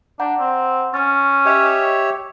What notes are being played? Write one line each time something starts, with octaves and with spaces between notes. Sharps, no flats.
D4 F#5 A#5 G6
C4
C#4 C#6 F6 A6
G4 C#5 D#5 E5
D#6